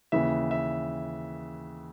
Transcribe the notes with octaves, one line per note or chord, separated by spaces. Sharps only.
D#2 C#3 E3 E5
E5